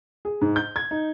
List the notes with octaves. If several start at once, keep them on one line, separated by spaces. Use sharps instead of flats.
G#4
G#2
G6
G#6
D#4